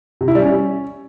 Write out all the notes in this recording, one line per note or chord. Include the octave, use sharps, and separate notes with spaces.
C3
E4
G3
C#4